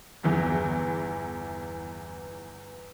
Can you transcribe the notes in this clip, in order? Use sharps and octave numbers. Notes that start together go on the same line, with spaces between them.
G1 E2 E3